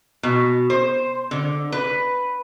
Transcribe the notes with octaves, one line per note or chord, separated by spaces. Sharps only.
B2
C5
D3
B4